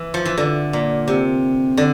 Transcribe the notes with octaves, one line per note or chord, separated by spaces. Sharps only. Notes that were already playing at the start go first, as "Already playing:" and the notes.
Already playing: E3
F3
E3
D3
A#2
C3
D3